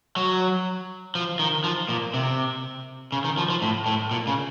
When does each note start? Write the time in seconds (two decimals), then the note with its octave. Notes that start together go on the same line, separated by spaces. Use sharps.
0.16 F#3
1.15 F3
1.39 D#3
1.64 F3
1.89 A#2
2.14 C3
3.12 C#3
3.24 D#3
3.38 F3
3.50 F3
3.62 A2
3.86 A2
4.11 A#2
4.27 C#3